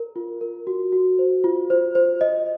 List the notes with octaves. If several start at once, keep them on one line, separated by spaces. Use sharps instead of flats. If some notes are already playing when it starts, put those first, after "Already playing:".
Already playing: A#4
F4
A#4
F#4
F#4
C5
F4
C5
C5
D#5